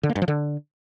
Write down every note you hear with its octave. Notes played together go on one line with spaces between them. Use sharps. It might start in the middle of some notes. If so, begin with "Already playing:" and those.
D3
A#3
G2
F3
D3